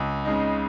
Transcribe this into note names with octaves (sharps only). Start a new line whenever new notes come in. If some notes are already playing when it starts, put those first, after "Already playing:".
Already playing: C#2
C#3 G#3 D#4